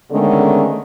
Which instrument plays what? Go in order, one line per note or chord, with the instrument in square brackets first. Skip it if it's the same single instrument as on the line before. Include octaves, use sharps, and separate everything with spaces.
[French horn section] D3 D#3 G#3 A3 B3 C#4